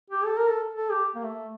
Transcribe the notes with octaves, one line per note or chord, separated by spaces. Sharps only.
G4
A4
A#4
A4
A4
G4
A#3
A3